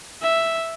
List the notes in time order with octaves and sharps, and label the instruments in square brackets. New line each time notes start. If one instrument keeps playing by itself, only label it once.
[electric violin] E5